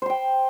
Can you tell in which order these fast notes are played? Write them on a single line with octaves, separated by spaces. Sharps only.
C5 C6 G5